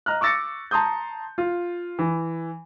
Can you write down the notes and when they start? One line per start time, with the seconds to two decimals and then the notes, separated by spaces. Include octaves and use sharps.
0.06 D#5 A#5 F6 F#6
0.21 C#6 D6 E6 A6 A#6 C#7
0.71 A5 A#5 C6 D#6 G6
1.38 F4
1.99 E3